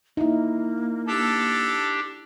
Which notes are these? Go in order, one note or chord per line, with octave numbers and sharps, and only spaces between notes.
A#3 D#4 E4
D4 G4 A4